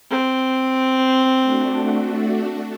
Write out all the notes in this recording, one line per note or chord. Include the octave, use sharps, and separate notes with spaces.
C4
A3 D4 F#4